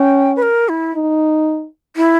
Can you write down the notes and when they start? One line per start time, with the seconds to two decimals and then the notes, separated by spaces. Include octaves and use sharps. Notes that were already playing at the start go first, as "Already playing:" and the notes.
Already playing: C#4 G5
0.36 B4
0.42 A#4
0.69 E4
0.94 D#4
1.96 E4